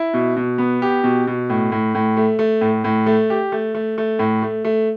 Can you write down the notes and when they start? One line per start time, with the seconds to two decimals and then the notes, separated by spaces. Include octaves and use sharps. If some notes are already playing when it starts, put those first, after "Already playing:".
Already playing: E4
0.14 B2
0.37 B2
0.58 B3
0.82 G4
1.04 B2
1.27 B2
1.50 A2
1.72 A2
1.95 A2
2.17 A3
2.39 A3
2.61 A2
2.84 A2
3.06 A3
3.30 G4
3.52 A3
3.75 A3
3.98 A3
4.19 A2
4.42 A3
4.65 A3